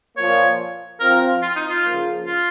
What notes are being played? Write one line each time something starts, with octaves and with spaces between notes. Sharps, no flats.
A#2 F3 A#3 C#5
F3 C4 F4 A#4
F4
D#4
F4
C#3 F3 A#3
F4